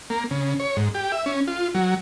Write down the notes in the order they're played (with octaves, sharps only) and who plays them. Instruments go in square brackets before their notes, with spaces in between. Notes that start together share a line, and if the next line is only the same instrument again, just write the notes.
[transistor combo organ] A#3
C#3
C#5
G#2
G4
E5
C#4
F4
F#3